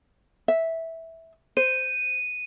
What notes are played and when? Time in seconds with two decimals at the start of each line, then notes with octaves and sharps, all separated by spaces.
0.48 E5
1.57 C5 D#7